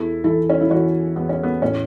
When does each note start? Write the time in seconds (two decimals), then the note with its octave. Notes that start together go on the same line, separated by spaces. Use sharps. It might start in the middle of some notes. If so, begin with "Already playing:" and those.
Already playing: E2 E4 A4
0.24 E3 E4 A4
0.49 C#4
0.61 E4
0.70 E3 C#4 F#4
1.16 E2 B3
1.29 C#4
1.43 B3
1.62 A2 C#4